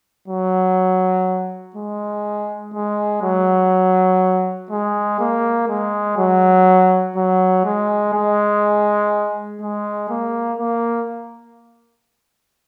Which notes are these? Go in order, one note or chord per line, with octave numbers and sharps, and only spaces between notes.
F#3
G#3
G#3
F#3
G#3
A#3
G#3
F#3
F#3
G#3
G#3
G#3
A#3
A#3